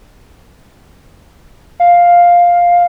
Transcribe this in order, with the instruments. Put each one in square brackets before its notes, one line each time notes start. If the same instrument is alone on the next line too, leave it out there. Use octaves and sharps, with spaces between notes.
[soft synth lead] F5